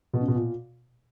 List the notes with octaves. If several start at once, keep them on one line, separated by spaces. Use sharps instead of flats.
B2
C#3
B2
A#2